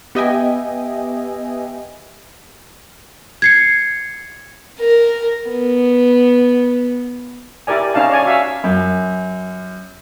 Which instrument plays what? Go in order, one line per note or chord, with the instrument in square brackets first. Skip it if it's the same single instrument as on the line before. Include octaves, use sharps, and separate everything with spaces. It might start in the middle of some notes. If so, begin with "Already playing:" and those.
[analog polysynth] B3 G4 D#5 E5 G5 G#5
[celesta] G#6 C7 C#7
[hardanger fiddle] A#4
B3
[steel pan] E4 G4 A#4 D5 G#5
C#4 D#4 F5 A5
C#5 D5 G#5
F#4 E5 F5
[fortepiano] F#2